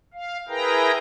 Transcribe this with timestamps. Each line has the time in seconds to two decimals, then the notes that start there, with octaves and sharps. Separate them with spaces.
0.14 F5
0.49 E4 G#4 A#4 B4 G5 A#5